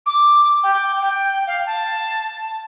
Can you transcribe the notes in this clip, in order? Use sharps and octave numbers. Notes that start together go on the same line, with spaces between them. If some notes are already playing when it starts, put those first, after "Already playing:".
D6
G5
G5
F5
A5